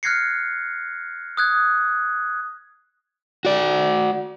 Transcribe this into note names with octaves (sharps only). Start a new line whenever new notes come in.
F6 F#6 G#6 A#6 C7 C#7
D#6 F#6 G#6
F#4 D5